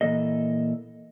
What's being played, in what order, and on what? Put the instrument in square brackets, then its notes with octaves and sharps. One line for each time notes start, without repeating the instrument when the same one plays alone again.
[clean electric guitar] A#2 E3 A#3 A4 D#5